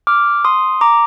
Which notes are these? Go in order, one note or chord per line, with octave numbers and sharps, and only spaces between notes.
D6 F6
C6 D#6
A#5 D6